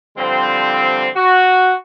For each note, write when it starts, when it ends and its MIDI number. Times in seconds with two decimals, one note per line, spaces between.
0.18 1.08 50
0.18 1.08 53
0.18 1.08 55
0.18 1.08 60
1.16 1.73 66